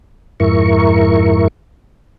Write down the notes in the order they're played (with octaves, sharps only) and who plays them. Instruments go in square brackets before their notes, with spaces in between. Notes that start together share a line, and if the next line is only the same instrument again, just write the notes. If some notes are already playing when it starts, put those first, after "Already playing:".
[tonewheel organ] F2 G#2 E4 A#4 C#6